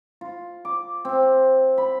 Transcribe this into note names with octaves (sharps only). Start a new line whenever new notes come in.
F4
D6
C4
B5